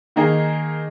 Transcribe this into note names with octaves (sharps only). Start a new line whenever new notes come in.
D#3 A#3 D#4 G#4